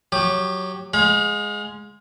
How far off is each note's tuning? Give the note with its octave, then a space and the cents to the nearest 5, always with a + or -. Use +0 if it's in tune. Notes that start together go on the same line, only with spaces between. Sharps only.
F#3 +0 G4 +0 D6 +40
G#3 +0 F5 +40 B5 -45